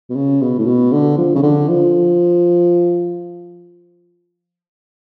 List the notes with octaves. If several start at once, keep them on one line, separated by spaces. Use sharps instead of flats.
B2
C#3
B2
A2
B2
D3
F3
C#3
D3
F3